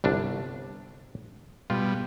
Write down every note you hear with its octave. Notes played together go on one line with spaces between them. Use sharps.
G1 C2 D4
B2 G3 F4